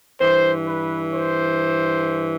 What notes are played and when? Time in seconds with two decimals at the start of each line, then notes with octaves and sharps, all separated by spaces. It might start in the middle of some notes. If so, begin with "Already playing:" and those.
0.20 G2 E3 C5
0.66 B4
1.12 C5